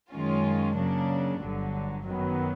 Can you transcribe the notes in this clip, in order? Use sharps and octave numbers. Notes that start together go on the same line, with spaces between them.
F#2 D#3 G#3 C#4 F4
C#3 F#3 A#3 D4
G1 G2 D3 F#3
F#2 D#3 F#3 B3